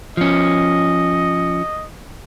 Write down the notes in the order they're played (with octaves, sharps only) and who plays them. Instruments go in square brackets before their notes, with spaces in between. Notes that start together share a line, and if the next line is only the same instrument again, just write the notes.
[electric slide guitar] F3 C#4 [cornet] D#5